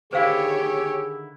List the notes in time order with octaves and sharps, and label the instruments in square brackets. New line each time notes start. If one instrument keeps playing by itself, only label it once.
[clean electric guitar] D3 D#3 E4 [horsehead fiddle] G4 C#5 [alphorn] G#4 [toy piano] C5 F5